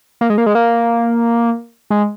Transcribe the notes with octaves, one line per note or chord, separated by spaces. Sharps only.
A#3
G#3
A#3
G#3
A#3
G#3